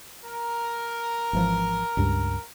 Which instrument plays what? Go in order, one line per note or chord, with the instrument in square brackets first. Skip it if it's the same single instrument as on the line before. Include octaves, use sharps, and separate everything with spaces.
[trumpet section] A#4
[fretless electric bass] G#1 E3 F3
C#2 G2